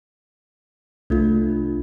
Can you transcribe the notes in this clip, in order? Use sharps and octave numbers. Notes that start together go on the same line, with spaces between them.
C2 A3 D4 F4